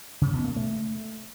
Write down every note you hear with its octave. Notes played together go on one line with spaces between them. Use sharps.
C#3
B2
A#3
A3